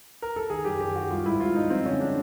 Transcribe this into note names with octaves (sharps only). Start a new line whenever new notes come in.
A#4
A4
D#3 G#4
F#2 G4
D#3 G4
D#3 F#4
G3 F4
G#2 E4
G#2 F4
G3 D#4
F3 C4
D3 C#4
G#3 D4